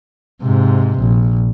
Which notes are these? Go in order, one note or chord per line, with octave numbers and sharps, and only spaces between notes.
G#2 C3
A#1